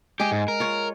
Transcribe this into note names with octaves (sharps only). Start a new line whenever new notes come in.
G#3 G4 G#4
G#2
A#4
F4 C#5